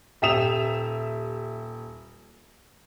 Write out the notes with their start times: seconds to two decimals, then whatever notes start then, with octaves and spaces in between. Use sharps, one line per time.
0.22 D#1 G4 E5 D#6 E7 F7